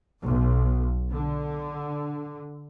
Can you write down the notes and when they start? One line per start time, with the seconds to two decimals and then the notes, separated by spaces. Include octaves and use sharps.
0.25 B1
1.11 D3